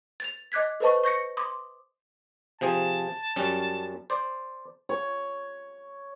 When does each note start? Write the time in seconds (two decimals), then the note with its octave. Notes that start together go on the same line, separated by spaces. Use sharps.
0.20 A6 F7
0.52 D#5 D6 F#6 G#6 B6
0.80 A4 B4 C5 D#5 A5 C#6
1.03 C#6 G6 A#6 C#7
1.37 C6 D6 D#6
2.61 C3 F3 G#4 A5
3.36 F#2 G3 C#4
4.10 C5 D5
4.89 C#5